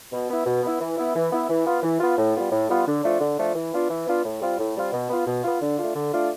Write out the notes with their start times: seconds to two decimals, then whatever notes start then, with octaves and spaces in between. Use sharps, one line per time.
0.12 B2
0.30 B3 E4
0.46 B2
0.63 B3 E4
0.81 E3
0.98 B3 E4
1.15 E3
1.32 B3 E4
1.50 E3
1.67 B3 F4
1.83 E3
2.01 B3 F4
2.18 A2
2.35 G3 B3 F4
2.52 A2
2.69 G3 B3 F4
2.87 D3
3.04 F3 A3 D4 F4
3.21 D3
3.38 F3 A3 D4 F4
3.55 E3
3.73 B3 D4 F4
3.90 E3
4.06 B3 D4 F4
4.25 A2
4.41 G3 C4 F4
4.59 A2
4.76 G3 C4 F4
4.93 B2
5.10 B3 F4
5.27 B2
5.44 B3 F4
5.61 D3
5.79 A3 D4 F4
5.96 D3
6.13 A3 D4 F4